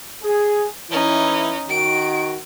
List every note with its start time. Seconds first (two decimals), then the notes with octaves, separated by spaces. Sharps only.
0.23 G#4
0.91 E3 C#4 D#4 E4
1.69 D#3 F#4 D7